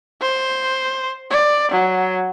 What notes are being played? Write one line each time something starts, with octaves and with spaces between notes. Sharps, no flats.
C5
D5
F#3